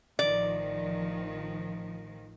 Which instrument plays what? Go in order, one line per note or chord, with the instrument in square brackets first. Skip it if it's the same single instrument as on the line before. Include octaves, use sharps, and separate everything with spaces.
[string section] A1 D#3 F3 [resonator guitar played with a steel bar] D5